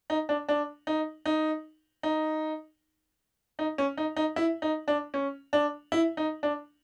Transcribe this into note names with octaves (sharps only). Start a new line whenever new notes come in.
D#4
D4
D4
D#4
D#4
D#4
D#4
C#4
D#4
D#4
E4
D#4
D4
C#4
D4
E4
D#4
D4